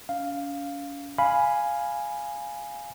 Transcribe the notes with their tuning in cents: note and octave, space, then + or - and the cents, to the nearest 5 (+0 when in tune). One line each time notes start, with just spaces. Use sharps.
C#4 +40 F5 +0
F5 +0 G#5 +0 B5 +0